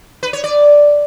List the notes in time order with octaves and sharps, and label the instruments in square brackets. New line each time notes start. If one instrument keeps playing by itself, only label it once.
[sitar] B4
C#5
D5